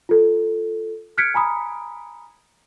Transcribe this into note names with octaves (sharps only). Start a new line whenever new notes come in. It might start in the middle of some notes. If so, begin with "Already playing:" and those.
F4 A4
F6 F#6 G#6 B6 C#7 D7
G#5 A#5 B5 D#6